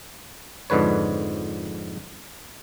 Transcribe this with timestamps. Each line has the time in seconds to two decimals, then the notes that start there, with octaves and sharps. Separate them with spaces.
0.70 F2 G#2 D3 B4 C#5